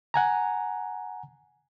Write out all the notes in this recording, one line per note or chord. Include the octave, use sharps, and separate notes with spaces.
F#5 G#5 A#5